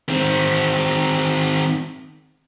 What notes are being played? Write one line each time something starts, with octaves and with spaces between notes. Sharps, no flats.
D#3 C4